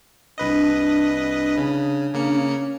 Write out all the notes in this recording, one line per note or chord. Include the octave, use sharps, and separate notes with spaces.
C2 D4 B4 D#5
D4
D4
C#3
C#3 A#3 D4 C#7
C#4